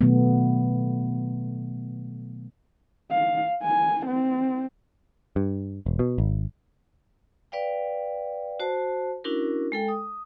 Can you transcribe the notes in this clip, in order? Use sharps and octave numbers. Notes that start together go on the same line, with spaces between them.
B2 D#3 F#3 A3 B3
F5
G#5
C4
G2
E1
B2
G#1
B4 D5 F5 G5
F#4 C5 A5
C#4 D4 E4 F#4 A#4
G#3 A4 G5
D#6